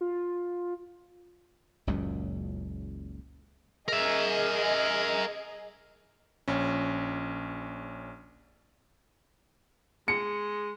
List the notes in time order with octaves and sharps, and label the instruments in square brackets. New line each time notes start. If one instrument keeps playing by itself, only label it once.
[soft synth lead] F4
[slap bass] F#1 C#2 F#2 A#2
[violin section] G#4 D#5 [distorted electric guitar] A#4 E5
[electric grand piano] A#1 C#4
[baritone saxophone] G#3 [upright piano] C#7